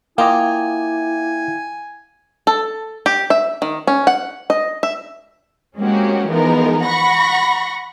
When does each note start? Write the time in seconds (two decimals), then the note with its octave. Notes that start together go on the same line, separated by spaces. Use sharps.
0.18 A#3 E4 F4 D#5 F5 G5 G#5 D6
2.47 A4
3.06 G4
3.30 E5
3.62 D#3
3.87 C#4
4.07 F#5
4.50 D#5
4.83 E5
5.78 G#3 A#3 C4 C#4 F#4 G4
6.27 E3 F3 G#3 B3 D#4 A#4
6.83 F#5 B5 C#6 A#6